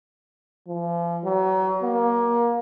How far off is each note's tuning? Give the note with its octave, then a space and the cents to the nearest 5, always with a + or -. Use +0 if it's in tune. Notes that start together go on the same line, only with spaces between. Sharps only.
F3 -35
F#3 +35
A#3 +20